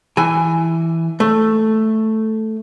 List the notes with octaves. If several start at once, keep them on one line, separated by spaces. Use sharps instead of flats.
E3 G#5
A3